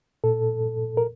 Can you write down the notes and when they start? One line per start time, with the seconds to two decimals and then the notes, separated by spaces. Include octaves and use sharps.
0.24 A#2 A4
0.97 A#4